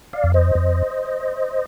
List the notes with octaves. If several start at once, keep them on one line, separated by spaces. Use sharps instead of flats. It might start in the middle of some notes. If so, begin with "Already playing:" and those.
D5 F5
F2
C5 D#5
F2